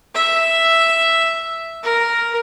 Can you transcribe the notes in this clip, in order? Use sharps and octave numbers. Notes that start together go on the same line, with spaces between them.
E5
A#4